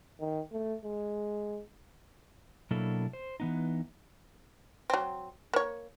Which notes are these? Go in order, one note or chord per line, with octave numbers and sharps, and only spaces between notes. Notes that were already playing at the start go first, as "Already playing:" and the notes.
D#3
A3
G#3
B2 F#3 A#3 D4 E4 A4
C5
E3 B3 D#4
F#3 C4
A#3 C#5